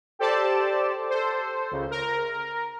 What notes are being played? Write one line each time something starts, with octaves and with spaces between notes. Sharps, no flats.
G4 A4 C5 D5 A5
A4 C5
C#2 C#3
A#4